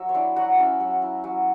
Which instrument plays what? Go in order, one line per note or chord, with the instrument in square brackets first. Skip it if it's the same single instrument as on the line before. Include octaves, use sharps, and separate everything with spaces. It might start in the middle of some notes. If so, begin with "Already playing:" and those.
Already playing: [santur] F#3 E5
C#5
D4 E4 D5
F#3 F#4 F#5
C#4 E4 E5
F#3
E4
F#3